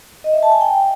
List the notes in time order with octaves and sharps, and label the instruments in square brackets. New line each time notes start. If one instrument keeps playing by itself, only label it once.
[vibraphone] D#5
E5
A5
G#5
G5